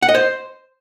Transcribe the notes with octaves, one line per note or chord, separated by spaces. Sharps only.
F#5
D#5
C5